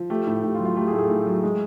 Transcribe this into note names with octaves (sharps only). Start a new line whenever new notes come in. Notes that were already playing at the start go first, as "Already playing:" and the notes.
Already playing: F3
A3 G4
A2
A2 G4
F4
F#3
F4
A3 G4
G#4
A2 A4
G#4
A2
F#3
G#3